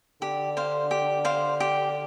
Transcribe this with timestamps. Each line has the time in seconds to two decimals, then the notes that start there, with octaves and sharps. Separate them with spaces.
0.21 D3 G4
0.57 C5 F5
0.91 G4
1.25 C5 F5
1.60 G4